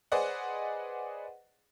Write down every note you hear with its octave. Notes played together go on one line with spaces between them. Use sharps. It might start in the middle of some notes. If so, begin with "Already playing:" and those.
G#4 B4 C5 D5 D#5 F#5